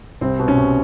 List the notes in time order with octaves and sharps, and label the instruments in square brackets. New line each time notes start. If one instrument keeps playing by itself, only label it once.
[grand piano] C2 C4
B2
C#4
C2